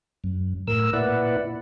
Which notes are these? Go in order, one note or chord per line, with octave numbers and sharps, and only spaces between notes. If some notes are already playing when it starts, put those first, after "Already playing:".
F#2
A2 A#4 E6
A#2 E4 B4 D5 F#5